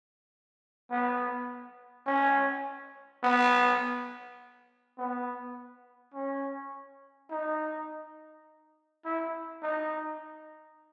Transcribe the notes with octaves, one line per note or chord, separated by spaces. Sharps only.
B3
C#4
B3
B3
C#4
D#4
E4
D#4